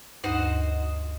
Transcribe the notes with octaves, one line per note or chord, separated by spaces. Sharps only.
D2 G2 D#4 F#4 C5